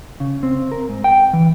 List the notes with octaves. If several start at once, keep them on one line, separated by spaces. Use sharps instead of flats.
C#3
C4
A#4
G#2
G5
E3